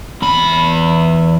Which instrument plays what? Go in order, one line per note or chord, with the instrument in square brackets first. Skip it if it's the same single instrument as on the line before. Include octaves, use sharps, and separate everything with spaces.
[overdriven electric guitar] E2 B5